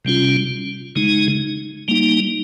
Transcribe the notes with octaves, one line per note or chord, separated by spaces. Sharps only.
C3 G3 C#4 F4
C#3 G#3 D#4
G3 A#3 D#4